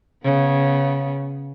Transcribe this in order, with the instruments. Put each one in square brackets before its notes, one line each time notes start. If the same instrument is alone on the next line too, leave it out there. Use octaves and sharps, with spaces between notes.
[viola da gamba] C#3 B3